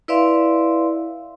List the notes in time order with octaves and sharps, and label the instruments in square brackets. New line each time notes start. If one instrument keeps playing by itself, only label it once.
[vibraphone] E4 B4 D5 E5 F5 C6